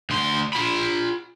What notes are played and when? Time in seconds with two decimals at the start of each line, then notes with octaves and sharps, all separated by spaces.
0.10 D2 C6
0.53 F4 B5